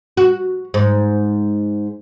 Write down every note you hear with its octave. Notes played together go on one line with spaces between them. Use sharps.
F#4
G#2